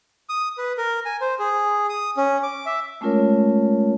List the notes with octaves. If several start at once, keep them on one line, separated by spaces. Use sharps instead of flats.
D#6
B4
A#4
G#5
C5
G#4
D#6
C#4
D6
E5
G#3 A3 C#4 F4 A#4 C#5